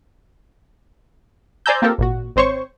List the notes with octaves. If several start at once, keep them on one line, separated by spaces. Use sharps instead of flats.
C5 D5 G#5 A#5 E6 G6
A#3 C4 F4 G4 A4 A#4
G#1 A#2 F#4
G#1 C4 C5 C#5 C#6